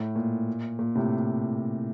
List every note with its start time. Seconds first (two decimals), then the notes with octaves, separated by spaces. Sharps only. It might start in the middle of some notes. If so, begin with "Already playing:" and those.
Already playing: A2
0.16 A#2
0.79 A#2
0.95 A2 C3